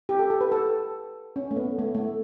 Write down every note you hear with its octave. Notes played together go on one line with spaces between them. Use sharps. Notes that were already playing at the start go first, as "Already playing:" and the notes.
G4
A4
A4
B4
A4
C#4
A3
B3
A3
A3